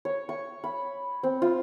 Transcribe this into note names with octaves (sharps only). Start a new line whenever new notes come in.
C#5
C#6
B5
C4
F4